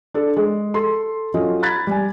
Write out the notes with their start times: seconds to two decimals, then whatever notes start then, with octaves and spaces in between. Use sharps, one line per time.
0.14 D4 A4
0.37 G#3
0.74 A4 C6
1.34 F#3 C#4 F4 A4 D#5
1.62 A#5 B5 F#6 G#6 A6 B6
1.87 G3 G#5